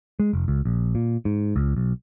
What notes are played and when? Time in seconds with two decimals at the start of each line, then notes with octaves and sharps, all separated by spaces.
0.20 G#3
0.33 F1
0.48 C#2
0.65 A#1
0.95 A#2
1.25 G#2
1.56 C#2
1.76 B1